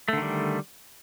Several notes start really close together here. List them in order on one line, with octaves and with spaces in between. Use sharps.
A3 D3 D#3 G3